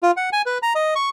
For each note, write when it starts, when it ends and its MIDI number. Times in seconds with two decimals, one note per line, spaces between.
0.03 0.11 65
0.17 0.30 78
0.33 0.42 80
0.46 0.58 71
0.62 0.73 82
0.75 0.94 75
0.95 1.09 85